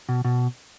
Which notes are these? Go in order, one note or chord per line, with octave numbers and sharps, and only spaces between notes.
B2
B2